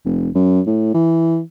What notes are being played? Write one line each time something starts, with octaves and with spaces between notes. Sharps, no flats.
F1
F#2
A2
E3